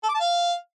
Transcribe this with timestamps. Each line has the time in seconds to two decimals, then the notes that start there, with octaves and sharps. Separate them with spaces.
0.04 A4
0.09 D6
0.15 A5
0.20 F5